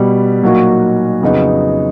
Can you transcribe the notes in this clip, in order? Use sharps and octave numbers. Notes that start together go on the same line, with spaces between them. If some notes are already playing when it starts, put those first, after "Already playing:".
Already playing: B2 G3 B3
A#2 F#3 A#3 D#4 F#4
F2 C#3 F#3 B3 D#4